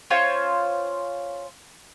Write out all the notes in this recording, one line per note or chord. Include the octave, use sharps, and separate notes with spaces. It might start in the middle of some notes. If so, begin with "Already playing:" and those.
C#4 F4 C5 C#5